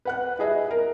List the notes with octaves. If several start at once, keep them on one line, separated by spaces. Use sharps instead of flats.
B4 F#5 F#6
E4 G#4 D#5 E5
A#4